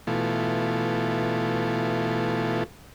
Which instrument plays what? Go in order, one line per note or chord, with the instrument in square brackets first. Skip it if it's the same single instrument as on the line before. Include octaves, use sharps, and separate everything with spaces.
[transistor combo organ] B2 E3 A3 F4